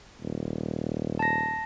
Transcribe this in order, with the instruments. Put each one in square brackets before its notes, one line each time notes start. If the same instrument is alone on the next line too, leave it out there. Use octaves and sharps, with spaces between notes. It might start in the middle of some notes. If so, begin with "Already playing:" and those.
[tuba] D#1
[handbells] A5 A#6